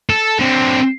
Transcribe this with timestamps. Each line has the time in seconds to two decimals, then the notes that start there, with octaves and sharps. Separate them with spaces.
0.10 A4
0.39 D3 C4